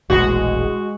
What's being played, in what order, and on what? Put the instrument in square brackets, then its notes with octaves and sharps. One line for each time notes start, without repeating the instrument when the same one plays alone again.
[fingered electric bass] E1 A#1 A2 [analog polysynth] G#3 [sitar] F#4